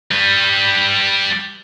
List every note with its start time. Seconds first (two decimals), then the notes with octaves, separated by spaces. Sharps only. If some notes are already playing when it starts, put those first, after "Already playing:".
0.11 G3 B4